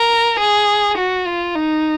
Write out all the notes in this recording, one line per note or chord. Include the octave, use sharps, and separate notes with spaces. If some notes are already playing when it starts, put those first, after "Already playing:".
Already playing: A#4
G#4
F#4
F4
D#4